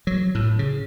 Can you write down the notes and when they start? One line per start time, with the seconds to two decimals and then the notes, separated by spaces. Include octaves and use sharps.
0.07 F#3
0.35 A2
0.59 C#3